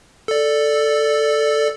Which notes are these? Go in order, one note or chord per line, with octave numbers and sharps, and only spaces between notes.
A4 D5